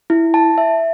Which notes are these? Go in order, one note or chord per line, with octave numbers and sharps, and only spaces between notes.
E4
A5
E5